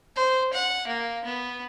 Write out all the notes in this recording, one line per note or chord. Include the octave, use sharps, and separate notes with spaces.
C5
F#5
A#3
B3